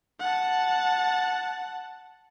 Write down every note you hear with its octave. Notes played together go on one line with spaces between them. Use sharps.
F#5 A5